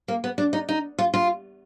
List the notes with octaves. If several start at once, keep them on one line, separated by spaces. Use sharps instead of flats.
A#3
B3
D4
D#4
D#4
F4
F4